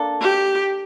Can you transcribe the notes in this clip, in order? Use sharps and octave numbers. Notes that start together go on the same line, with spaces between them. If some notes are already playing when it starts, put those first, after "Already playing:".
Already playing: A#3 D4 A4
G4